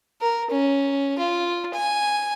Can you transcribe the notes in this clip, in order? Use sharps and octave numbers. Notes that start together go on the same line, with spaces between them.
A#4
C#4
F4
G#5